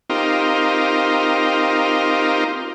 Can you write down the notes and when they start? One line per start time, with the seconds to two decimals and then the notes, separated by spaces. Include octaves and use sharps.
0.10 C4 D#4 F4 G4 A#4